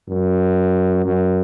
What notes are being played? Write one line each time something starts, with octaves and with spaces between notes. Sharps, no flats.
F#2
F#2